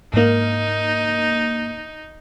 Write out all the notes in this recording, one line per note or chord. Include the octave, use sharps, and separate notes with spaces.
G#2 A#3 D#4